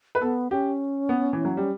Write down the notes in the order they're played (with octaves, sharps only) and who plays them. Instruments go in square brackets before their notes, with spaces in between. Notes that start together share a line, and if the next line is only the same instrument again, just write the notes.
[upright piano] B4
[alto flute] B3 [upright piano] A4
[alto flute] C#4 [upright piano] G4
[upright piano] B3
E3
F#3
G3